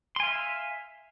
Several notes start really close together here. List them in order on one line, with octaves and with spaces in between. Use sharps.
C6 G#5 F5 E5